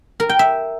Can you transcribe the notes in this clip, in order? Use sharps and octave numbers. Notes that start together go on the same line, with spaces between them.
A#4
G5
E5